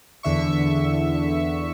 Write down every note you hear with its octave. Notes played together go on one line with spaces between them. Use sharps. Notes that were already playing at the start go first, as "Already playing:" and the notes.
E2 D3 E5 C#6